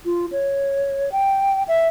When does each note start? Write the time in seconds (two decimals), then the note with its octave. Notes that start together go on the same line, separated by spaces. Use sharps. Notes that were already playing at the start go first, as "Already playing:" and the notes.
0.05 F4
0.32 C#5
1.12 G5
1.68 E5